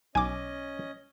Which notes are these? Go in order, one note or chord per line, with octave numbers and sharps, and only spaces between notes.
B1 C#4 D#5 G#5 D6